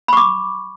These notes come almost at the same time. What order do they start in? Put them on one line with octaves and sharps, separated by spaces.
B5 C#6 D6